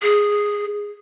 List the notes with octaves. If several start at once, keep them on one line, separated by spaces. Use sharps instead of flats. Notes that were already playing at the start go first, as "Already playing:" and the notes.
G#4